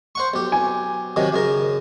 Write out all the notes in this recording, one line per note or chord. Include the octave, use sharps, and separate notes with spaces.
C5 F#5 C#6
B1 G4
G#5
C3 D#3 F#3
F#2 C#3 A#4